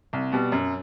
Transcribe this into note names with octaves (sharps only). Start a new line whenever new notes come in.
C2
B2 G3
F#2